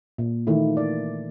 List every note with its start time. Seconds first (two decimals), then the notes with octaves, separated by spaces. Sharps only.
0.18 A#2
0.47 D#3 E3 A3 A#3 E4
0.77 D5